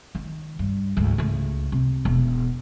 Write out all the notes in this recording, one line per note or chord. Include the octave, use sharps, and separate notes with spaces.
D#3
G2
D2 G#2
C#2 A3
C3
E1